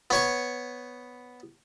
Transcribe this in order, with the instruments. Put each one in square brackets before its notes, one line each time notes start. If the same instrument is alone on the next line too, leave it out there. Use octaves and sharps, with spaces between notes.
[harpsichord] B3 C#5 C#6